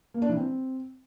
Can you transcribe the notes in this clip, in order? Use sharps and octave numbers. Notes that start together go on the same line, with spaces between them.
A#3
D4
E3
C4